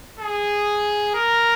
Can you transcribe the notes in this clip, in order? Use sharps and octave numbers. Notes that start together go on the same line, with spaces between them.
G#4
A#4